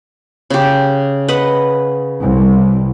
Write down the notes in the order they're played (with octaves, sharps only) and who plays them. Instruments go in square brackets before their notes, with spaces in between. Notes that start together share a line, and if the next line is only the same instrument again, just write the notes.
[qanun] C#3 G4
B4 D#5 F#5
[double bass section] C2